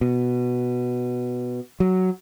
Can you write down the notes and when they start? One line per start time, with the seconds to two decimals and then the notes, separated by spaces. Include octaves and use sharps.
0.01 B2
1.80 F#3